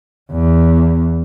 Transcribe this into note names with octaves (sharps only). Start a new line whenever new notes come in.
E2